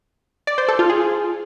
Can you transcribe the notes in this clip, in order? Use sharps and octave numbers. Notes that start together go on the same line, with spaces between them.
D5
C5
A4
F4
G#4